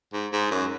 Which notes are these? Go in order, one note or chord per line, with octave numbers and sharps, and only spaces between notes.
G#2
G#2
F#2